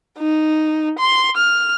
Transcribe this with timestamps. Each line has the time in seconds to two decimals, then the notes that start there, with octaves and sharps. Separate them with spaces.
0.19 D#4
0.99 C6
1.37 F6